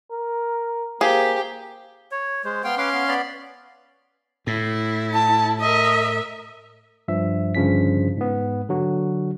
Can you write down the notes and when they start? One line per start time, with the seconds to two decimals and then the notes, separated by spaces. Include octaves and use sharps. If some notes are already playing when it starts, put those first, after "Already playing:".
0.11 A#4
1.01 A#3 G4 G#4 C5 F5
2.12 C#5
2.45 G#3 C5
2.64 B3 F5 G5 C6
2.78 C#4 B4 F5 C6 D6
2.93 B3
3.08 B3 D5 B5
4.47 A2 E4
5.14 A5
5.61 A#4 D#5 E5
7.08 G2 F3 E5
7.55 G1 G2 C#3 F3 C#4 B6
8.17 G#2 B3
8.69 D3 F#3 F#4